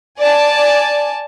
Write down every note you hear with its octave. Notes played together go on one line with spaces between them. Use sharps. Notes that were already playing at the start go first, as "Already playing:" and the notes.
D5 G#5 A5